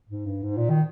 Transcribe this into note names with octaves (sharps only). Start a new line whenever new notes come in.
G#2
G2
G#2
A#2
D#3